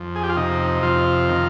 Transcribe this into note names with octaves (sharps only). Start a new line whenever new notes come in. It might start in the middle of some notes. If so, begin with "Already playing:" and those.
Already playing: F2
G#4
G4
F4
C3 D#4
F2 F4
D#3